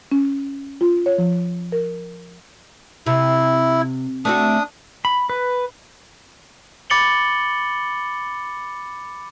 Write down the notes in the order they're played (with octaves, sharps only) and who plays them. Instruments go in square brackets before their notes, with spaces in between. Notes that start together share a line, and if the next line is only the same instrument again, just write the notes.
[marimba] C#4
F4
C#5
F3
A#4
[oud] C3 [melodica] E4
[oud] A3 C4 F#4 [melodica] D4 D#6
[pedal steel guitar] B5
B4
[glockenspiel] B5 D6 A6 C#7 F#7 G7